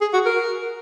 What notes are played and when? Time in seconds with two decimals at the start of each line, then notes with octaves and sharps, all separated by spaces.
0.01 G#4
0.13 F#4
0.26 A#4